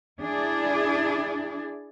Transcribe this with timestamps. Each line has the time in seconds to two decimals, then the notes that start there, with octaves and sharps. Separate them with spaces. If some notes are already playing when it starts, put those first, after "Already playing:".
0.21 D4 E4 G#4 D5